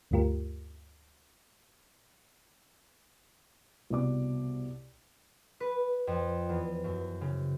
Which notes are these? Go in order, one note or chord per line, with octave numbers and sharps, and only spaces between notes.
D2 G2 A3 F4 G4 A#4
C2 B2 D5 D6
B4
F2
E2
F#2
C#3